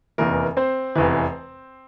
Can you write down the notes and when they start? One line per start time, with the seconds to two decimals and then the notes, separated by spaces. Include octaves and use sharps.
0.18 F1 E2 E3 A#3 A#4
0.57 C4 C5
0.95 F1 E2 E3